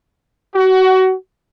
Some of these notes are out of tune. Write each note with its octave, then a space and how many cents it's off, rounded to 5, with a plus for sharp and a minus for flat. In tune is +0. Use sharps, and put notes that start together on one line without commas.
F#4 +25